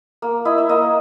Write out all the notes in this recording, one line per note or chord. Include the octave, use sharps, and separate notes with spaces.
A#3
E4 D#5
E5
A#3 D#5